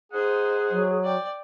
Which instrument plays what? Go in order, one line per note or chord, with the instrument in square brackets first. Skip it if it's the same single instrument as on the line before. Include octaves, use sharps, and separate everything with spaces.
[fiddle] D#4 C5 [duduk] G#4 [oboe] F#5
[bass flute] F#3
[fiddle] D5 G5